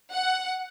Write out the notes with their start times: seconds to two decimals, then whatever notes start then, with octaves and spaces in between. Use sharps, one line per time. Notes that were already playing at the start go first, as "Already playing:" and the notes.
0.13 F#5